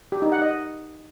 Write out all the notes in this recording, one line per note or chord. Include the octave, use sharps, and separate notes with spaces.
G4
D#4
F#5
D#5